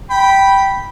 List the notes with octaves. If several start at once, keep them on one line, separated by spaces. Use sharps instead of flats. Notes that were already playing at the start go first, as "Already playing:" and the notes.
G5 B5